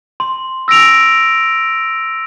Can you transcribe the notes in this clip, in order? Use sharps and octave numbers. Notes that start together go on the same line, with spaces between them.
C6
E6 A#6 D7 F7